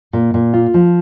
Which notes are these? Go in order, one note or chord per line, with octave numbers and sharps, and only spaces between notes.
A#2
A#2
F4
F3